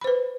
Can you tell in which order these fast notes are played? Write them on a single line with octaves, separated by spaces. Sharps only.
B5 C5 B4